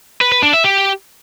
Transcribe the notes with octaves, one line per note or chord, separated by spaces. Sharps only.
B4
B4
D4
E5
G4